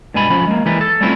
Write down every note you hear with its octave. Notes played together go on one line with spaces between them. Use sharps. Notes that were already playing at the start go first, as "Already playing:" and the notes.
G2 B2 G#3 G#5 B5
F3 C#4 B5
G#3 A#3
E3 G3 G#3 A#3 B4
A4
G3 A3 C4 C#4 E4 F4